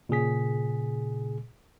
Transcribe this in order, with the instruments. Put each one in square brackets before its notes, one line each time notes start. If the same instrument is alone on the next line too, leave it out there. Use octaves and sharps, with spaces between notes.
[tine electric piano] A#2 C#3 G#4 B6